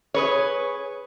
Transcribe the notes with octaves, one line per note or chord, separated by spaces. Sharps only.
G#4 B4 C#5